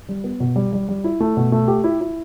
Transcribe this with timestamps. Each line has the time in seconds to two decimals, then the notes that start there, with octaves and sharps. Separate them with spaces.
0.09 G3
0.24 B3
0.40 B2
0.56 G3
0.73 G3
0.89 G3
1.04 E4
1.20 A3
1.37 B2
1.52 A3
1.68 G4
1.84 E4
2.01 E4